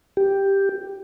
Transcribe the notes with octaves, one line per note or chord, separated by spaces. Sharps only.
G4